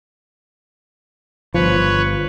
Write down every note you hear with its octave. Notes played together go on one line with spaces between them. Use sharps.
G1 F3 B4 C#5